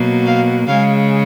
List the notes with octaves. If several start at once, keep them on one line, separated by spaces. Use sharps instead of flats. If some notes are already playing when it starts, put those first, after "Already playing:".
Already playing: B2 F#3 A#3
F5
C#3 G#3 F5